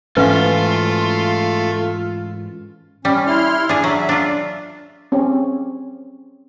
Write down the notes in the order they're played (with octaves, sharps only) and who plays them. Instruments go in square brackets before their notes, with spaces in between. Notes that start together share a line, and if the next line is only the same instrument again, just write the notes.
[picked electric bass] G#2 E3 C#4 [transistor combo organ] A3 [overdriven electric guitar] F4 [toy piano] B4 E5 F5
[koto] G3 [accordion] C#4
[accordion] E4 C6 F6
[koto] D4 G#4
[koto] F#3 [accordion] E5
[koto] D4 F4
[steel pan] C4 C#4 G4